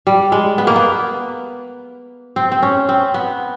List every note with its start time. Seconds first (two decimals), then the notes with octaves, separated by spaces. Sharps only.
0.07 G3
0.32 G#3
0.58 B3
0.67 A#3
0.76 B3
2.36 C4
2.52 C4
2.62 C#4
2.89 C4
3.14 B3